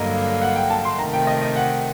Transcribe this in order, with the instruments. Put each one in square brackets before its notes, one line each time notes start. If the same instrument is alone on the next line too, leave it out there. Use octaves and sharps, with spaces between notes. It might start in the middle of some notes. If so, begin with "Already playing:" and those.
Already playing: [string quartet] G2 D3 F#3 A#3 [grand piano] D#5
[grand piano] F#5
G5
A5
C6
[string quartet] C3 D#3 A3 [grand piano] A#5
[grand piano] G5
D#5
D#5
F#5